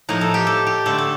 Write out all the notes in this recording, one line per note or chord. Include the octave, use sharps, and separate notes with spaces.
A2 F3 A#3 D#4
A4
G4
A4
G4
D3 A3 A4
A4